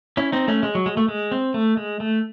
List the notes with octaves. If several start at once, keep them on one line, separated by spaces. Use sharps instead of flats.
C#4 E4
C4 D#4
A3 C#4
G#3
F#3
G#3
A3
G#3
C4
A3
G#3
A3